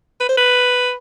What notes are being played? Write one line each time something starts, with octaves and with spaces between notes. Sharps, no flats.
B4
C5
B4